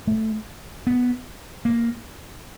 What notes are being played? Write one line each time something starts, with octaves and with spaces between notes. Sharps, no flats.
A3
B3
A#3